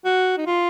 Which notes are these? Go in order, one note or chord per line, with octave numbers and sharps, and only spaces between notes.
F#4
D#4
F4